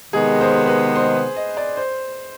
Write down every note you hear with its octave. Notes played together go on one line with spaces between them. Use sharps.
C3 D#3 G#3 B3 G#4
C5
B4
C5
D#5
D5
C5